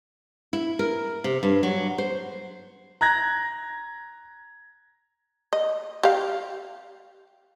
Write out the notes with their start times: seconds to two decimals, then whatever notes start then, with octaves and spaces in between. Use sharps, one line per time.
0.53 E4
0.79 A#4
1.24 C3
1.43 G2
1.63 F#3
1.98 C5
3.01 A#5 F#6 G#6 A#6
5.53 D#5
6.03 G4 F5